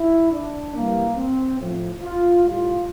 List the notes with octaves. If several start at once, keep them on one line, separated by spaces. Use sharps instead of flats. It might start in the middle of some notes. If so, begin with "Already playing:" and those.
Already playing: E4
D4
C3 E3 G3 A#3
C4
A2 F3
F4
A2 G3 F4